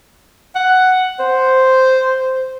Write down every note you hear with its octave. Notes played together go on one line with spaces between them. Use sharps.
F#5
C5